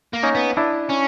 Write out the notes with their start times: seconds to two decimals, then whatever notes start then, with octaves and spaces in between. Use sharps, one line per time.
0.13 A#3
0.23 C#4 D#4
0.35 B3
0.57 D4 E4
0.89 C#4